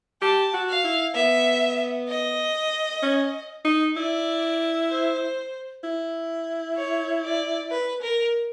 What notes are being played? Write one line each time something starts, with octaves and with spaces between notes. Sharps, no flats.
G4 A5
F#4
F5
E4
B3 E5
D#5
C#4
D#4
E4 D5
C5
E4
C#5
D5
B4
A#4